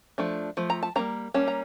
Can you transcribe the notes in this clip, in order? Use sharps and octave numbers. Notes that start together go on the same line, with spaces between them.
F3 A3 D4
F3 A3
A#5
A5
G3 A#3 C#4 A#5
G3 A#3 C#4 A5
A#5